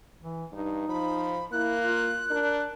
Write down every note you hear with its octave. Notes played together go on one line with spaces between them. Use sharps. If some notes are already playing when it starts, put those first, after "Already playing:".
E3
G2 D#4
F3 B5
A#3 E4 F#6
F4
D4 A#4